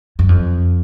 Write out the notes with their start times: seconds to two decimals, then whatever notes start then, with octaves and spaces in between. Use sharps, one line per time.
0.19 F#2
0.29 F2